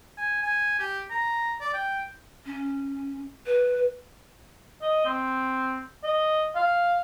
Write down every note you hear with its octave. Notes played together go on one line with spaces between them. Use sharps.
G#5
G#5
G4
A#5
D5
G5
C#4
B4
D#5
C4
D#5
F5